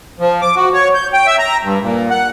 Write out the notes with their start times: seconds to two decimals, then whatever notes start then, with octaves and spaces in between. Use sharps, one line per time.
0.19 F3
0.42 D6
0.56 F#4
0.73 C#5
0.94 G6
1.13 G5
1.27 E5
1.39 A#5
1.63 G2
1.82 A#2
2.10 F#5